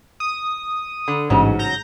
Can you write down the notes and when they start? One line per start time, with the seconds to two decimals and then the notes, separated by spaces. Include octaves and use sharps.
0.20 D#6
1.08 D3
1.30 A1 G#2 C#3 F#3 C#4
1.59 A#5 G6 A#6